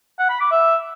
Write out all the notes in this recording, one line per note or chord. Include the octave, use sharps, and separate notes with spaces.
F#5
B5
D6
E5